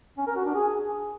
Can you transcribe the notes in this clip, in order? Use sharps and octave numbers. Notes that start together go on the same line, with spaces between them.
C#4
A#4
F#4
D4
G#4